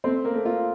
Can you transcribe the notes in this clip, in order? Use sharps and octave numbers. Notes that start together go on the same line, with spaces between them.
A3 C4 C5
A#3 A#4
A3
F4